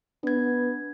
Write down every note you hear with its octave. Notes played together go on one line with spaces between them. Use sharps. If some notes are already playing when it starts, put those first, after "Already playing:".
B3 D4 G#6